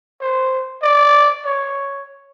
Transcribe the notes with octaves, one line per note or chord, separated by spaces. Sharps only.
C5
D5
C#5